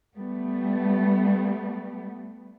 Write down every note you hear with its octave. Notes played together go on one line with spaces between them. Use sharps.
G3 A3 B3